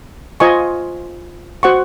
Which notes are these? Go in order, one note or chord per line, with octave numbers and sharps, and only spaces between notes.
F4 C5 D#5 G#5 C#6
F#4 C5 F#5 C#6